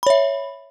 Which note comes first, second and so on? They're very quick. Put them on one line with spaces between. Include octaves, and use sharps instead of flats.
B5 C#5 E5